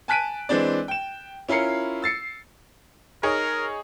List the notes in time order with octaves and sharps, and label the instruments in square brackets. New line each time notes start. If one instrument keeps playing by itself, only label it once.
[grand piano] G#5 A5 F#6 B6 D7 D#7
E3 G#3 C4 D4 D5
G5 E7
C#4 E4 F4 A#4 C7 C#7
E6 A6 C7 C#7
[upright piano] D#4 G#4 C#5 [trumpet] A#4